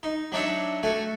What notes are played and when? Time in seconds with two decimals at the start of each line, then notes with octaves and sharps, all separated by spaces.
0.03 D#4
0.32 F#3 D4 D#4 C#5 E5
0.83 A3 F#4 G#5